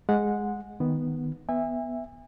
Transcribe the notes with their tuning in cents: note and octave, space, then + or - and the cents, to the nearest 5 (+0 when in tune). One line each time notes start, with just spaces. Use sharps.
G#3 +0 F#5 -15
D#3 +0 B3 +0
B3 -5 E5 +0 G#5 -35